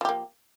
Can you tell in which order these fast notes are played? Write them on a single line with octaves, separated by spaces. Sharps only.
F3 G4 A#3